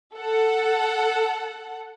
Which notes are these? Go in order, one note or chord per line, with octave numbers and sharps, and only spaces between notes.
A4 F#5